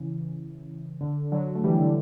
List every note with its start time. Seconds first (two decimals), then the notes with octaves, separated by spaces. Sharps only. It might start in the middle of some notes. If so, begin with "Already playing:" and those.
Already playing: C#3 E3
1.01 D3
1.32 D3 F#3
1.55 A3
1.64 E3 G3
1.79 D3